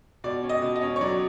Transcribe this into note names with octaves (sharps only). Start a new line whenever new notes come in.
B2 D5
C#4
D#5
B2
D#5
C#4
C#5
F#3 D5